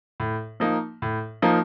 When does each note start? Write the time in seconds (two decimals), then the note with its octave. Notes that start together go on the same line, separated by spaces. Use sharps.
0.20 A2
0.60 F3 A#3 D#4
1.02 A2
1.42 F3 A#3 D#4